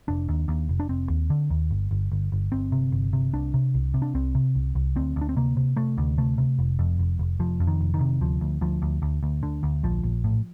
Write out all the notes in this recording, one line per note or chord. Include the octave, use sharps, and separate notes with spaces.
F1 D4
D#2
D#2
F1
D4
F1 C4
D#2
D3
D#2
G1
G1
G1
G1
G1 C4
C3
G1
C3
C2 D4
C3
C2
C3
D4
C2 C4
C3
C2
C2
D2 C4
D2
D4
C4
C3 A#3
C3
C3 A3
D2
C3 A3
C3
F1
F2
F1
F1
F1 F3
F2
D#3
F1
D#3
C3
D2 F3
D2
D2 F3
D2
D2
D2
D3
D2
A#1 F3
A#1
A2